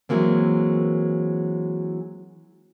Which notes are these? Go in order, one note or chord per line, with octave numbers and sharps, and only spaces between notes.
E3 F#3 G#3 A#3 C4